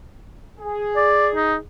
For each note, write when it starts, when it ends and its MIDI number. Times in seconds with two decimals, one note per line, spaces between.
0.60 1.60 68
0.96 1.28 74
1.35 1.55 63